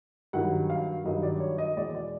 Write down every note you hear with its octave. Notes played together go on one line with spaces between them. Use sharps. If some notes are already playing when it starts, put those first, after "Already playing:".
G2 D#3 F#3 F#5
F5
G2 D#3 F#3 D#5
D5
C#5
D#5
E2 B2 G#3 D5
D5